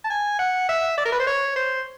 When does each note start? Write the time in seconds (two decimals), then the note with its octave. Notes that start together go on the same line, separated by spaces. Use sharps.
0.04 A5
0.10 G#5
0.39 F#5
0.69 E5
0.97 D5
1.05 A#4
1.12 B4
1.20 C5
1.27 C#5
1.56 C5